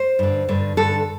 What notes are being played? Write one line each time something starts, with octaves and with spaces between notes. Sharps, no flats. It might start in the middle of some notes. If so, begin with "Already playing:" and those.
Already playing: C5
G2 D3
G2 D3
G2 D3 A4